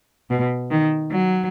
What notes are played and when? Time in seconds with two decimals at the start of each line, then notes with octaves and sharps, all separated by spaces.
0.30 B2
0.71 D#3
1.12 F#3